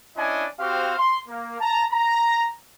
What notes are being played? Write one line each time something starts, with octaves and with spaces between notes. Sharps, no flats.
C#4 D4 E4 D5 D#5 G#5
C4 F#4 G4 C5 F5
C6
A#3
A5 A#5
A#5